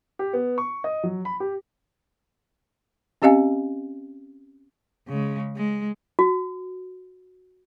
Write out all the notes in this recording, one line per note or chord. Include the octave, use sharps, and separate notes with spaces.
G4
B3
C#6
D#5
F#3
B5
G4
C4 C#4 G4 D#5 F5 G#5
C#3 G#3
G#3
F#4